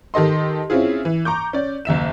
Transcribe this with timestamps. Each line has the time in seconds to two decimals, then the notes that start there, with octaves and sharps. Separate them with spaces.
0.14 D#3 G4 A4 D#5 C6
0.70 C4 C#4 E4 F4 G#4
1.05 E3
1.25 A#5 C#6 D6 G6
1.53 C#4 D5
1.85 F#1 D#2 E5 E7